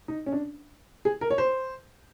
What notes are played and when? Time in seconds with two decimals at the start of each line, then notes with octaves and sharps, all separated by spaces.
0.08 D#4
0.26 C#4
0.32 D4
1.05 G#4
1.21 A#4
1.30 C#5
1.38 C5